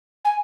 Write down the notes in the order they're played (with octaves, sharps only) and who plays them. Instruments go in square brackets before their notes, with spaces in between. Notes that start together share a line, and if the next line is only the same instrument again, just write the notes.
[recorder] G#5